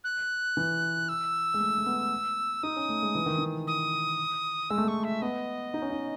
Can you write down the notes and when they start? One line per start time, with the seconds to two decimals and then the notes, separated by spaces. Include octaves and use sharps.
0.04 F#6
0.57 E3
1.09 E6
1.54 G#3
1.60 A3
1.78 A3
1.86 B3
2.63 D#4 D#6
2.76 C#4
2.89 A3
3.03 G#3
3.15 E3
3.26 D#3
3.38 E3
3.67 D#6
4.70 G#3 E6
4.78 A3
4.85 G#3 C#6
5.04 E5
5.22 B3 D#5
5.74 D#4
5.82 C#4
5.90 D#4